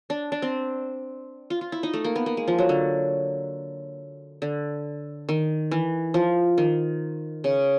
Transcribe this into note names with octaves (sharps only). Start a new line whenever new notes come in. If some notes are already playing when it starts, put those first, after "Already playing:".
D4
D4
C4
F4
F4
E4
D#4
A3
A#3
B3
A#3
G#3
F3
F#3
D3
D3
D#3
E3
F3
D#3
C#3